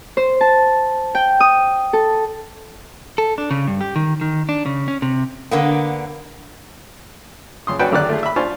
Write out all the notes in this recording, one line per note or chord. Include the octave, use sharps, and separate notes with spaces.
C5
A5
G5
D#6
A4
A4
D4
C#3
G2
G4
D#3
D#3
D4
C#3
C#4
C3
D3 A#3 B3
C#2 C6 D#6
F#2 D4 F#4 B4 G5
G#1 D3 D#3 D5 F#6
A3 F4 G#4
E5 B5
D4 F4 C5 G#5 C#6